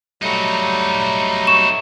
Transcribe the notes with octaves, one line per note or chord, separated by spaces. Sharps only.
F#3 G3 A3 D#4 F#4
C#6 E7